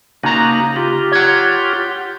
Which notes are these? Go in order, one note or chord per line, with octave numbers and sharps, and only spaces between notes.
C#3 A#3 D#4 F#4 A#5
F4 G4
C#5 F#5